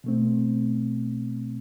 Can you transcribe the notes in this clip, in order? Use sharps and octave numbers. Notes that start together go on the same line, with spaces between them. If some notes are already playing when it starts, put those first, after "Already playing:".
B2 A3 C4